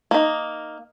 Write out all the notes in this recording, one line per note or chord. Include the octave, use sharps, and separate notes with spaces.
A#3 D#4